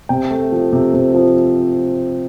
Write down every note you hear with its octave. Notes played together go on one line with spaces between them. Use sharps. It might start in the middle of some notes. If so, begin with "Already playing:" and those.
C3 G5
A3
F3
C3
C3
F3